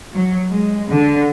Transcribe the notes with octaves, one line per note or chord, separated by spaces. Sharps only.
F#3
G#3
D3